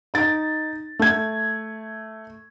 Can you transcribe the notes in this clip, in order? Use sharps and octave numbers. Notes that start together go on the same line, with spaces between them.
D#4 A6
A3 G#6